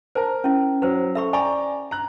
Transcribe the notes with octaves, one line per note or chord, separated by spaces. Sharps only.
A#4 C5 A5 A#5
C#4 E4
F#3 B4 C5
A4 E5 B5 C#6
D5 G5 G#5 A#5 B5 C#6
A#5 F#6